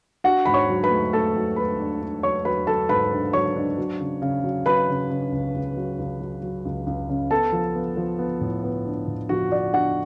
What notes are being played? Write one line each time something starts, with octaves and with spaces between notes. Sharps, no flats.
D4 F#4 F#5
G#2 B5
C#5 C#6
F#3
B4 B5
A3
A3 A4 A5
F#3
A3 B4 B5
D4
D4
F#3 C#5 C#6
F#3 B4 B5
F#3 A4 A5
G#2 B4 B5
D4
F#3 C#5 C#6
D4
F#3
C#3
C#3
F#3
F#3 B4 B5
C#3
C#3
C#2
C#2
F#3
C#2
F#3
F#3
C#2
C#2
C#3
B3 A4 A5
F3
B3
F3
B3
A2
B3
D4
A2
F3 F#4 F#5
F3 D5
D4 F#4 F#5